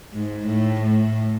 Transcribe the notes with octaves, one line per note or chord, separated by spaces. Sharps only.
G#2
A2
A2